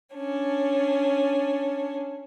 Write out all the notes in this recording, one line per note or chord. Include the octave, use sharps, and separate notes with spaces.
C#4 D4